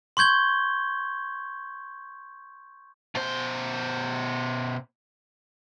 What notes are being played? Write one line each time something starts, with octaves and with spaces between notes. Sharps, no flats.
C6 C#6 G6 G#6 G7
B2 C5